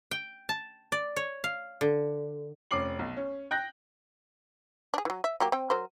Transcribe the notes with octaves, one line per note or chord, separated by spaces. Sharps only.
G5
A5
D5
C#5
F5
D3
F1 C#4 D6 C7 F#7
B1
C#4
G5 F#6 G6 A#6
D4 G#4
E3 F#3
E5
F#3 A#3 G4
C4 G5
F#3 A#4 C5